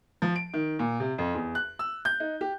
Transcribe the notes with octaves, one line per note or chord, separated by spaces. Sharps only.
F3
D7
D#3
A#2
C3
F2
E2
F#6
E6
G6
D#4
G4